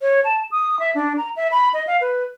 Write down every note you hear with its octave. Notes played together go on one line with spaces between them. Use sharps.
C#5
A5
D#6
E5
D4
A#5
E5
B5
D#5
F5
B4